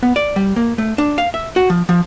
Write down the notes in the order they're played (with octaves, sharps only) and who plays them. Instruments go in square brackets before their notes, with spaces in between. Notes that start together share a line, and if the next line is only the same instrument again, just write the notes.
[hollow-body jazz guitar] B3
D5
G3
A#3
A3
D4
F5
E5
F#4
F3
F3